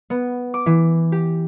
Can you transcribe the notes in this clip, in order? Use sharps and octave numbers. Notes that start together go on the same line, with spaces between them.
B3
D6
E3
G4